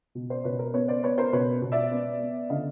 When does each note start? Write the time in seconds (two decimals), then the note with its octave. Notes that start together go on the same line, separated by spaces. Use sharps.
0.15 B2
0.30 C5 D5
0.44 B2 B4 C#5
0.59 A#4 C5
0.74 B3 B4 C#5
0.88 C5 D5
1.03 B3 B4 C#5
1.18 A#4 C5
1.33 B2 B4 C#5
1.62 B2
1.72 D5 E5
1.91 B3
2.21 B3
2.50 D3 D#5 F5